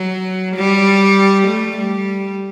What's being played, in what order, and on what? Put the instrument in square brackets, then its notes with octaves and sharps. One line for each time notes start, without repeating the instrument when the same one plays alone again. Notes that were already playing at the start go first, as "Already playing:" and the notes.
Already playing: [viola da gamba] F#3
G3
A3
G3